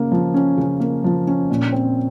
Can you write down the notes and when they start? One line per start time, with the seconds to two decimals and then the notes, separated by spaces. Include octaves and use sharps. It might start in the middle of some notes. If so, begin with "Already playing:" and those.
Already playing: C#3 A#3
0.12 F3
0.34 C#4
0.58 C#3
0.80 A#3
1.04 F3
1.27 C#4
1.50 A#2
1.72 C4